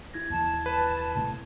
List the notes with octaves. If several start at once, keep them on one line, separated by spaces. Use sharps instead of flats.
E4 G#6 A#6
D#2 E3 A5
B4
A2 C3 A3